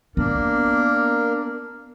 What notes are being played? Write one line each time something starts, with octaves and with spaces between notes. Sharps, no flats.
A#3 B3 D4 A#4